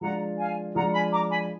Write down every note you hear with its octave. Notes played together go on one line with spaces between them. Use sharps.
F3 G#3 D4 F4 F#5 A#5
F5 G#5
F3 G#3 D4 F4 F#5 A#5
G#5 B5
A#5 D6
G#5 B5